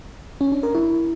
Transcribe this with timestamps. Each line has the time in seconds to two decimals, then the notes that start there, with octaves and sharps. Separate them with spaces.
0.41 C#4
0.52 D4
0.63 A#4
0.75 E4